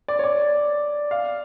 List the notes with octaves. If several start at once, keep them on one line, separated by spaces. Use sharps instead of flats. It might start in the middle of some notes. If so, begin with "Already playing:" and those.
D5
C#5
D5
F5